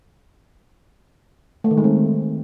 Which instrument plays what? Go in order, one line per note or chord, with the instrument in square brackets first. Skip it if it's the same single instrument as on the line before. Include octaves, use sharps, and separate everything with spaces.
[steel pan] A3
D#3
G#3
C4